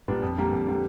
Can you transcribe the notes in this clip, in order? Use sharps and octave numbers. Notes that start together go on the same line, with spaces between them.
A#2 G3 B3 D4
F2
D3 G3 A#3
F2
D3 G3 A#3